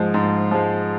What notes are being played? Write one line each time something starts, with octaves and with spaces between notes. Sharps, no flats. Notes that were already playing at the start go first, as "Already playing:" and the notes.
Already playing: G#2 F3 G#3
G#2
F3 G#3